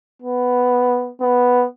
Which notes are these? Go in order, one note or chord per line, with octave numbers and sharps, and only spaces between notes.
B3
B3